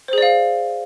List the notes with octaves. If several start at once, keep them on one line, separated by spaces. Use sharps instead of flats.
G#4 C5 D5 F5